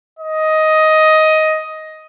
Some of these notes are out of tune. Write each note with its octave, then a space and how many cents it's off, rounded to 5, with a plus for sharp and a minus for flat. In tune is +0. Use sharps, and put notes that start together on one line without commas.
D#5 +10